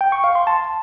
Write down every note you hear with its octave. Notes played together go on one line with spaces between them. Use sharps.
G5
C#6
F5
C6
A5